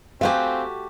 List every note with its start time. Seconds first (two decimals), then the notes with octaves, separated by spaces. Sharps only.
0.21 A3 C4 F#4 G4 F5 G#5